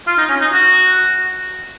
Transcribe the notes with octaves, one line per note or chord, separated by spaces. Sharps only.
F4
D#4
C#4
D#4
F#4